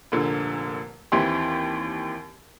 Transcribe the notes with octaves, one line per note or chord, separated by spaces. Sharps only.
F1 A#2 D3
D#2 E3 C4 G4 C6